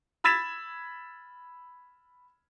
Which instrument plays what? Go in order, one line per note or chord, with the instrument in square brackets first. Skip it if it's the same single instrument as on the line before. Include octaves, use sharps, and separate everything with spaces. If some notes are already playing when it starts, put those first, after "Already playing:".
[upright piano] B5 E6 G#6 A6 B6 E7